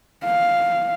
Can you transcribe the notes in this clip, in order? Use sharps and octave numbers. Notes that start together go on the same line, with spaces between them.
F5